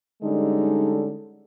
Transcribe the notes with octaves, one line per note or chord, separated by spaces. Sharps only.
D3 G3 G#3 C#4 D#4 A4